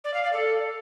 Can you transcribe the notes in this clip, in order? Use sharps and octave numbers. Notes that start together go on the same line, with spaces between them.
D5
F5
D5
A4